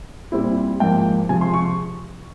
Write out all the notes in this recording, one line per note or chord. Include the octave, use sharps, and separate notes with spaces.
A#2 G3 C4 E4
G#2 F3 A#3 G5
C3 F3 G#3 G#5
C6
C#6